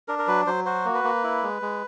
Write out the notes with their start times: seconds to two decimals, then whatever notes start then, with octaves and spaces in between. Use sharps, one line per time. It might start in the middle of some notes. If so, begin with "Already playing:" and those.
0.08 D4 A#4
0.19 A#4
0.28 F#3 B4
0.47 F#3 C5
0.66 F#4 C5
0.85 A#3
0.94 B4
1.04 A#3
1.23 E4
1.43 G#3
1.62 G#3